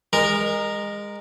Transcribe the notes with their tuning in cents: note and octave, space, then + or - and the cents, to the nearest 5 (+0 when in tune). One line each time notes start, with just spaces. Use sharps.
G#3 -25 A#4 +0